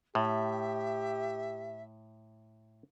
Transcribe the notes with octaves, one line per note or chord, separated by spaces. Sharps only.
A2 G4 E5